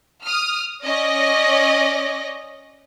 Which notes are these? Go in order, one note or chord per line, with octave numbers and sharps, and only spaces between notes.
D#6 F6
C#4 D5 D#5 A#6